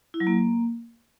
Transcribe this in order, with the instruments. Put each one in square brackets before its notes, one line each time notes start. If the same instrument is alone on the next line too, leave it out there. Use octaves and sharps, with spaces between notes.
[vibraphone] E4
F#3
A#3